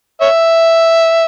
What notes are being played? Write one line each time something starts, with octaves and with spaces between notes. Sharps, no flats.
C#5 E5